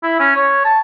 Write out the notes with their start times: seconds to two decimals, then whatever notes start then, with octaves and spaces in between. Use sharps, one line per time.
0.03 E4
0.20 C#4
0.36 C#5
0.65 A5